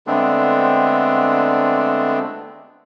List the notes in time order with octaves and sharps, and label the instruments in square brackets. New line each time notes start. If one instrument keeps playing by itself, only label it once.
[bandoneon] D3 G#3 A3 B3 C4 D4